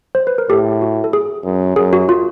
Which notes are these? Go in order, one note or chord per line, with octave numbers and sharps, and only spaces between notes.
C5
B4
A#4
A2 G4 A4
F#4
A4
G#4
F#2
F#2 G#4
F#4
F4